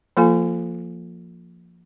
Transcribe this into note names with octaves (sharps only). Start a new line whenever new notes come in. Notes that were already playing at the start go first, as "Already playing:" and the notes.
F3 A#3 F4 A4 F5 G#5